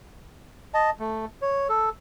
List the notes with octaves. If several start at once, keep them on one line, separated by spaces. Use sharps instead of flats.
D#5 A5
A3
C#5
A4